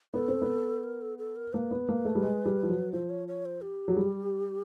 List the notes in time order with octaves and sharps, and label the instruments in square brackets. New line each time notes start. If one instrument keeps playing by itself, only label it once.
[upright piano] B3 [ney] A4
[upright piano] C4
B3
[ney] A#4
A4
A4
A#4
[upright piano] A#3 [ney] B4 C5
[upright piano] B3
A#3
A3
G3
G#3
G3
F3
F#3
[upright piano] F3 [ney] C5
[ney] C#5
C#5
C5
G4
[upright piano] F#3
G3